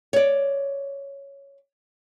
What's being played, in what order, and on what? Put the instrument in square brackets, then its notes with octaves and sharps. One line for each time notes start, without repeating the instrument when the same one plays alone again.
[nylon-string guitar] C#5 D5